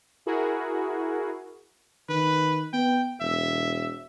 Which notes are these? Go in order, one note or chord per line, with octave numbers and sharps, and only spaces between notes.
E4 F#4 G#4 A#4
D#3 B4
B3 G5
E1 E5